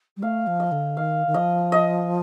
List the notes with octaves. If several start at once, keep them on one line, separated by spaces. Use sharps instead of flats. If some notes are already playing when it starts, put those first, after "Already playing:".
G3
A3 F5
F3
D#5
D3
D#3 F5
D#3
F3 D#5
D#5